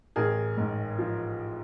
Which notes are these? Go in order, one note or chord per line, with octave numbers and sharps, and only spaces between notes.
A1 G#4 A#4
G#2
F3